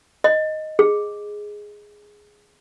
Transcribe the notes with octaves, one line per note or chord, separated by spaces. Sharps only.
D#5
G#4